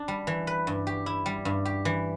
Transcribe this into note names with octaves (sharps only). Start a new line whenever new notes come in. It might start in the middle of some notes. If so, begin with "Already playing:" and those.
Already playing: D4
G3
E3
B4
G2
G4
E4
G3
G2
G4
E3